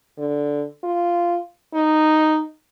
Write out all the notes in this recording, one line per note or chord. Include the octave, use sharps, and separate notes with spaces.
D3
F4
D#4